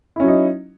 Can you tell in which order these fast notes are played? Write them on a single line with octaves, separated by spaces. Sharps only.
E4 C#4 F#3 D#4